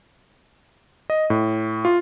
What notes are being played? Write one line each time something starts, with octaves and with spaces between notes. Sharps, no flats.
D#5
A2
F4